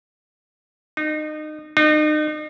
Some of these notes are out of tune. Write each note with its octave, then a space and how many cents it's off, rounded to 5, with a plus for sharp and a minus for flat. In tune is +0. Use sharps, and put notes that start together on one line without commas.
D#4 -25
D#4 -35